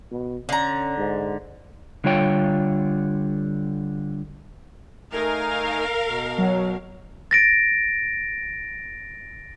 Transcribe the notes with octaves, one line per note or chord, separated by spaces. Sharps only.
B2
D3 C#4 A#5
G#2
D3 G3 F4 C#5 G5
A3 D#4 A#4 F5 G#5
B2
F#3
A6 A#6 D7